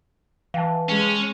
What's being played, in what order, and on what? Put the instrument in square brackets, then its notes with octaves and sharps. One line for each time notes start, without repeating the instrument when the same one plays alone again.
[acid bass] E3 [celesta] F5 G5 A5
[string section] G#3 [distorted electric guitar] C#4